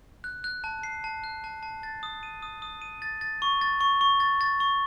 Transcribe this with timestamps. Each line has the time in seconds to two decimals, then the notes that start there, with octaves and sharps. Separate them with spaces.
0.24 F#6
0.44 F#6
0.64 A5
0.83 C7
1.04 A5
1.24 F#6
1.44 A5
1.63 A5
1.83 A6
2.03 D#6
2.23 D#7
2.42 D#6
2.62 D#6
2.82 D#7
3.02 A6
3.21 A6
3.42 C#6
3.61 A6
3.81 C#6
4.01 C#6
4.20 A6
4.41 A6
4.60 C#6